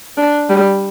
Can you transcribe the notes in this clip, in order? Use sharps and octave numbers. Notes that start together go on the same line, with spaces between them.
D4
G3